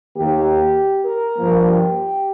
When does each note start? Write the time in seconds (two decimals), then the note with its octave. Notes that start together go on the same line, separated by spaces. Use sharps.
0.15 D#2 D#3 A#3 G4
1.06 A#4
1.37 G2 F3 A#3
1.67 G4